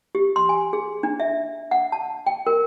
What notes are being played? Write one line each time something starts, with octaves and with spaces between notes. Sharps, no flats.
G4
C6
G#5
G#4
D4
E5
F#5
A5
G5
A#4